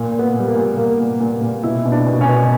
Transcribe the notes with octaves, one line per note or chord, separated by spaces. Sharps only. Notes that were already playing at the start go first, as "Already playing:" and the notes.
Already playing: A#2
A#2
B3
A#2
G3
A#3
A#2
A#2 A#3
A#2
A#2
A#2
B2 E4
B2
D4
B2
C#4
B2